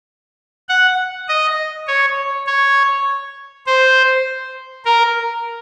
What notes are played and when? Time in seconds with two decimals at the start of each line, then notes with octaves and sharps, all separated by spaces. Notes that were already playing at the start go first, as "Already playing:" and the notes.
0.69 F#5
1.28 D#5
1.87 C#5
2.47 C#5
3.67 C5
4.85 A#4